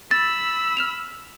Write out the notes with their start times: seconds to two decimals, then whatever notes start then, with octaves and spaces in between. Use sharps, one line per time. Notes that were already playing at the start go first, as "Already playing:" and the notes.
0.11 B5 E6 A6
0.77 F6 E7 F7